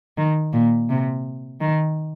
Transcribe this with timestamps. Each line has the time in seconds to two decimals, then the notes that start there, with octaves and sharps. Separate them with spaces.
0.17 D#3
0.52 A#2
0.89 C3
1.60 D#3